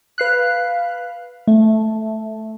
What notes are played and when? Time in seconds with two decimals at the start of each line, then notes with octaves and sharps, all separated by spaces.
0.18 B4 F5 F#6
1.48 A3